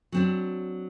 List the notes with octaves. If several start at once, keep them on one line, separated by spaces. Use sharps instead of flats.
F#3 C4 D4